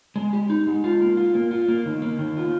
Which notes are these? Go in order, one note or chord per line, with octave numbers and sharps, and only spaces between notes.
G#3
G4
D#4
G#3
F4
A#3
F4
A#3
F4
A#3
D#3
A#3
D#3
F4